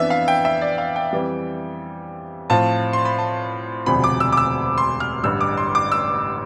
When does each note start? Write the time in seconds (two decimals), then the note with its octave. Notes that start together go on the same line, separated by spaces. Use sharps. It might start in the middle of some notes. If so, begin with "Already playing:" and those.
Already playing: F2 E3 B3 D4 E5
0.10 F5
0.28 G5
0.45 E5
0.61 D5
0.78 F5
0.96 G5
1.13 F2 E3 G3
2.50 A2 F3 C4 F4 A5
2.93 C6
3.05 B5
3.18 A5
3.86 E1 D2 C3 F3 B5
4.04 D6
4.20 E6
4.32 D6
4.37 E6
4.78 C6
5.00 F6
5.23 A1 G2 D3 G3 E6
5.41 D6
5.57 C6
5.75 D6
5.92 E6